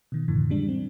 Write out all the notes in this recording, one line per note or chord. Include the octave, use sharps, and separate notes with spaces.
B2 D#3
F2 A2 D3 E3
G3 G#3 D4
C4